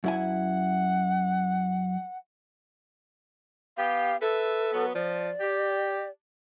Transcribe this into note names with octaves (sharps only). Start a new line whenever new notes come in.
F#2 E4 F#5 G#5
B3 G4 F5
A4 B4 E5
F#3 B3
F3 D5
G4